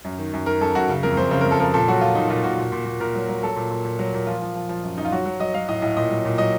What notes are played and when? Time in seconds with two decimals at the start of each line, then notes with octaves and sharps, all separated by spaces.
0.04 F#2
0.18 D#3
0.33 F#2
0.46 D#3 A#4
0.61 F#2 A4
0.75 F#2 F#4
0.89 C#3
1.03 F2 A#4
1.17 F2 C5
1.31 C#3 C5
1.41 F2 A#4
1.51 A4
1.60 F3 A#4
1.74 A#2 A4
1.88 F#3 F#4
2.01 A#2 F4
2.15 A#2 D#4
2.30 A#2 F4
2.44 A#2 F#4
2.59 A#2
2.72 A#2
2.86 A#2
3.00 A#2 A#4
3.15 F#3
3.29 F#3
3.43 F#3 A4
3.56 A#2
3.71 A#2
3.85 A#2
3.99 F#3
4.14 A#2
4.27 F3 F4
4.42 F3
4.55 F3
4.69 F3
4.83 F#2
4.98 F#2 D#4
5.05 F4
5.12 F#3 F#4
5.26 F#3
5.40 F#3 D#5
5.54 F#3 F5
5.68 A2 D#5
5.82 A2 D#5
5.97 A#2 D#5
6.10 F#3
6.25 A#2
6.38 F#3 D#5